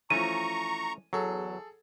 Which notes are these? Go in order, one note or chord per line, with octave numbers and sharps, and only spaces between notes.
E3 F3 A3 C#4 A5 A#5 C#6 D#7
E2 F#3 G#4 A4